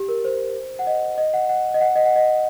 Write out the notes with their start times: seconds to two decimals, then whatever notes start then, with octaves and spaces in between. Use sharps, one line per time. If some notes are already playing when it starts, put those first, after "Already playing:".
Already playing: G4
0.09 A#4
0.25 C5
0.79 F#5
0.87 D#5
1.18 D#5
1.34 F#5
1.49 F#5
1.74 D#5
1.81 F#5
1.96 D#5
2.06 F#5
2.16 D#5